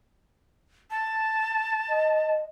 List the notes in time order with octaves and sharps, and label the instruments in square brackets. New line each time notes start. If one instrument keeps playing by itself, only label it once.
[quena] A5
[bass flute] D#5